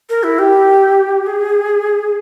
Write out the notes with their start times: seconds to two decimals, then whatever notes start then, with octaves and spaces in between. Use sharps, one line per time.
0.10 A#4
0.23 E4
0.39 G4
1.27 G#4